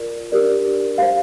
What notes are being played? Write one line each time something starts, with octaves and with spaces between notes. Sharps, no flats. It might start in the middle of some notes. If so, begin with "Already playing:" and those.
Already playing: F4 A#4 D5
D4 G4 A#4 D5
G4 C5 F5